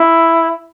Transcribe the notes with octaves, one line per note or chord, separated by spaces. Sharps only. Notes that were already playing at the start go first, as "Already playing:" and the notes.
Already playing: E4